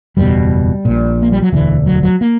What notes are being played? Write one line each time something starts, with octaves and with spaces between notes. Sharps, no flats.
F#1 E2 B2 G3
A#1 A#2
A#3
G3
F#3
E1 D2 D3 E3
F#3
F#3
A#3